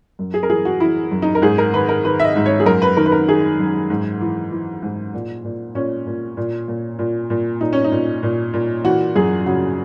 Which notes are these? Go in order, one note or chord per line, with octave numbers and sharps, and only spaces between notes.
F#2
G#4
A#4
E3 G#4
F#4
E3 E4
F#2
D#4
A#4
G#2 G#4
A#4
D#3 B4
A#4
D#3 B4
E5
D#5
G#2
C#5
G#4
F#2 A#4
B4
D#3 A#4
B4
A#4
D#3 G#4
F#2
G#2
E3
E3
G#2
A#2
A#2
A#2 C#4
A#2
A#2
A#2
A#2
A#2
A#2 D#4
C#4
D#4
A#2
A#2
A#2
E3 F#4
F#2 G#4
C#3 F#4